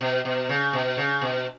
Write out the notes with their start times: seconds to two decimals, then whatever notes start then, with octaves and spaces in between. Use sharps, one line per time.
0.01 B2
0.25 B2
0.49 C#3
0.73 B2
0.97 C#3
1.21 B2